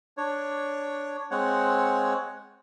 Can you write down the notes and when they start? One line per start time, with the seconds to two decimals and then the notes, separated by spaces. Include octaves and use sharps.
0.17 D4 C#5
1.31 G#3 C4 C#5 F#5